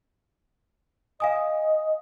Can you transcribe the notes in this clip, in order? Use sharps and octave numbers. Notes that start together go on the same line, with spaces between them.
D#5 F5 G#5 D#6